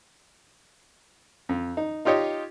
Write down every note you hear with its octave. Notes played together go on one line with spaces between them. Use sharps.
F2
D#4
D#4 F4 G4 C#5 D#5